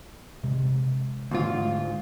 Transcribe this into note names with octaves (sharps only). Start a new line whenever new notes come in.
C3 G#3
D2 G#2 F4